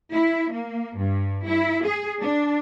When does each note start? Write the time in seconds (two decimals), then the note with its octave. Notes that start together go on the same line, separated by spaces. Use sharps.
0.13 E4
0.51 A#3
0.97 G2
1.46 E4
1.84 G#4
2.21 D4